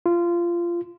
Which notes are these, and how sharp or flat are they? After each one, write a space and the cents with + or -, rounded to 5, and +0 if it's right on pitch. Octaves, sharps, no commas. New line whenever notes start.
F4 -20